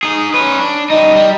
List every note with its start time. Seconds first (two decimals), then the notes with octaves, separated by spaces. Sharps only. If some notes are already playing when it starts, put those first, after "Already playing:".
0.03 D#4 G#4
0.34 C#4 B4
0.59 D4
0.90 G3 D#4 D#5
1.15 G3